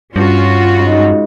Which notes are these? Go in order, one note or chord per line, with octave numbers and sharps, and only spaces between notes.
G2 C#4 F4 F#4
G#2 C#3